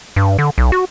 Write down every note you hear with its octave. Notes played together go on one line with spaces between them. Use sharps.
G2
D3
B1
F#4